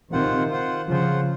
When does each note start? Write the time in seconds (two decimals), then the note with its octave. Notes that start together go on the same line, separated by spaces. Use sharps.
0.12 C3 D#3 F4 C5 F#5
0.50 F4 C5 F#5
0.90 C#3 F3 F4 C5 F#5